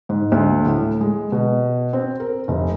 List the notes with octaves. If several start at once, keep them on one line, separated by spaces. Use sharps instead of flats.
G#2
D2
A2
G#3
B2
C4
A#4
F1